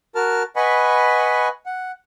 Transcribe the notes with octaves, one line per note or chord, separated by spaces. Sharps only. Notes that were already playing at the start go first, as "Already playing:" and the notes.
F#4 A#4 A5 F6
B4 D#5 F#5 G#5 B5 C#6
F#5